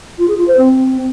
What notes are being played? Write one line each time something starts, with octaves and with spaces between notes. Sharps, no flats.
F4
G#4
F4
C5
C4